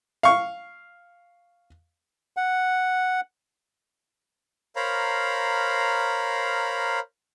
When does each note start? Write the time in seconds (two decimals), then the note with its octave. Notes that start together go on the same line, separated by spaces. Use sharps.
0.23 F5 C#6
2.37 F#5
4.76 A#4 C5 C#5 F5 A#5 B5